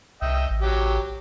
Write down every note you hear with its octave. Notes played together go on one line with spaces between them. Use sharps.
C2 D#5 E5 G5
A1
F#3 G4